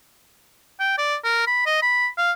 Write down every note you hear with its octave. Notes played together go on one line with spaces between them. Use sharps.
G5
D5
A#4
B5
D#5
B5
F5